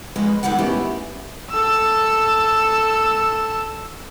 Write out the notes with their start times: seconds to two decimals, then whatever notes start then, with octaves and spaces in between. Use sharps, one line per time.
0.16 F2 G#3 C#4 B4 D#5
0.43 E2 D#3 E3 G3 F#5
0.58 G#3 A3 B3 C#4 E4 G4
1.50 A4 E6